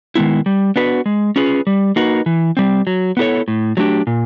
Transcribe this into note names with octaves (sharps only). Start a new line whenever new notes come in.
D#3 G#3 B3 E4
G3
B3 D4 F#4 B4
G#3
C#4 F4 G#4 B4
G3
A#3 D#4 F#4 B4
E3
G3 C4
F#3
B3 E4 A4 C#5
A2
F#3 A3 D4 G4
A#2